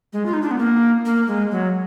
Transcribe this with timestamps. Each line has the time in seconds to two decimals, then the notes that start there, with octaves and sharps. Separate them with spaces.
0.13 G#3
0.26 F4
0.34 D#4
0.42 D4
0.51 B3
0.58 A#3
1.05 A#3
1.28 G#3
1.51 F#3